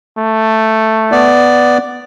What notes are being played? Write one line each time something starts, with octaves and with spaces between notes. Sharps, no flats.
A3
B3 D5